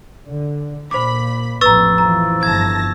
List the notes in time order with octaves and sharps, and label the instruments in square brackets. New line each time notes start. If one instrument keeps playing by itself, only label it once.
[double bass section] D3
[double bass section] A#2 [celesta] C5 D6 [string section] B5
[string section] A1 F2 [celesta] B4 A#5 [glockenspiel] C#6 E6 A6
[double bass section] E3 F3 [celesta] A#5
[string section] G1 A5 A#6 [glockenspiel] G#6